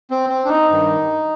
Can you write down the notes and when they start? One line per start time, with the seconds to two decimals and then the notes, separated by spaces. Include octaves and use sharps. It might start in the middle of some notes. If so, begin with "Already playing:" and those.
0.11 C4
0.30 C4
0.45 D4
0.49 D#4
0.69 G2 D#3